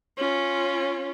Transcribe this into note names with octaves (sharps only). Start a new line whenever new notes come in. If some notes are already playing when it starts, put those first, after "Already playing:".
C#4 F4